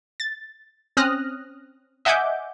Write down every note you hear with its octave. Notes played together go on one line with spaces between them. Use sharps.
A6
C4 C#4 D#6 F6 F#6 A#6
D#5 E5 F#5 G#5 D6 G6